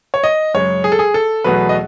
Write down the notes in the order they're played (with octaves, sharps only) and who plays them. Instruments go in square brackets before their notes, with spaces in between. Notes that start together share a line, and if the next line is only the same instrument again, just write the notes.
[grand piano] C#5
D#5
F#2 C#3 G#3 C#5
G#4
A4
G#4
A4
E2 B2 F#3 A3 B4
D#5